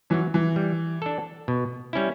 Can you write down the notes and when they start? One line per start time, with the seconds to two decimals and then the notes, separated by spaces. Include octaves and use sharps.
0.10 E3 C#4
0.14 F#3
0.34 E3
0.56 G3
1.02 D4 A4
1.48 B2
1.93 G3 C#4 E4